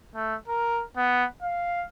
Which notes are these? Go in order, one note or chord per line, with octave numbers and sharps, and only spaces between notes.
A3
A#4
B3
F5